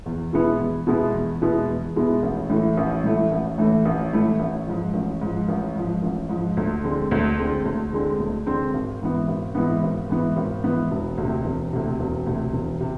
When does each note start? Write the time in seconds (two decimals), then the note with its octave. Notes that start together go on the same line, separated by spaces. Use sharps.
0.06 E2
0.33 B2 G#3 B3 E4
0.60 E2
0.87 B2 G#3 B3 E4
1.14 E2
1.42 B2 G#3 B3 E4
1.69 E2
1.96 B2 G#3 B3 E4
2.23 A1
2.50 A2 E3 A3 E4
2.77 A1
3.04 A2 E3 A3 E4
3.32 A1
3.58 A2 E3 A3 E4
3.85 A1
4.13 A2 E3 A3 E4
4.40 A1
4.67 G#2 F3
4.94 A1
5.21 G#2 F3
5.49 A1
5.75 G#2 F3
6.02 A1
6.29 G#2 F3
6.57 D2
6.84 D3 G#3 C4
7.11 D2
7.39 D3 G#3 C4
7.65 D2
7.93 D3 G#3 C4
8.20 D2
8.46 D3 G#3 C4
8.74 G#1
9.01 G#2 E3 B3
9.28 G#1
9.55 G#2 E3 B3
9.83 G#1
10.10 G#2 E3 B3
10.37 G#1
10.64 G#2 E3 B3
10.91 E1
11.18 D2 C3
11.45 E1
11.73 D2 C3
12.00 E1
12.26 D2 C3
12.53 E1
12.81 C3